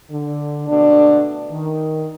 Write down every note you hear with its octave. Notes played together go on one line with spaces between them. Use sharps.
D3
B2 D3 A3 D4
D#3